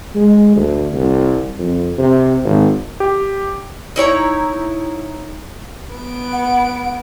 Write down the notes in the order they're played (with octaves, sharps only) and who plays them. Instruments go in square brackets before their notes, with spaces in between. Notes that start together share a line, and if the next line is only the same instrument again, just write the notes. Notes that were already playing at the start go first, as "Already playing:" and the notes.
[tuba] G#3
D2
C2
F2
C3
G#1
[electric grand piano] G4
[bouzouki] D#4 E4 C#5 A#5
[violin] B3 D7
[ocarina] F#5